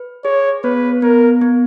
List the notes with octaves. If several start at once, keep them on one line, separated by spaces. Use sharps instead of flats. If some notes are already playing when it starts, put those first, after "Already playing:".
Already playing: B4
G#4 C#5
B3 B4
B3 A#4
B3